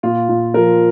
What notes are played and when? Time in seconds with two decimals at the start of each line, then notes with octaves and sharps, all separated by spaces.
0.03 A#2 F4
0.29 A#2
0.54 F3 A#4